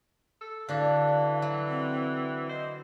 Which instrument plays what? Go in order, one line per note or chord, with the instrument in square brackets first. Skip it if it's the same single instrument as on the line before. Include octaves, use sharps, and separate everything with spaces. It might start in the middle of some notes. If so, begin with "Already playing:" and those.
[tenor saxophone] A4
[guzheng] D3 D4 F#4 [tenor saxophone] E3 [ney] F5
[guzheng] F#3
[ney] C4
[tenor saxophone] C5 [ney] D#5